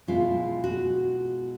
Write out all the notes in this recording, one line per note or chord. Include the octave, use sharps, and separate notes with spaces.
B2 G#3 B3 E4 F4
F#4